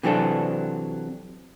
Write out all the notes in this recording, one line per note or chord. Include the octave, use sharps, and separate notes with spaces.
C3 E3 F#3 C4 D4 A4